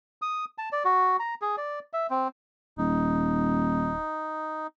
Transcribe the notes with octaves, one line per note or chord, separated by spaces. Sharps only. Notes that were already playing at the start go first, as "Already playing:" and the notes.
D#6
A5
D5
F#4
A#5
G#4
D5
E5
C4
D#1 D#4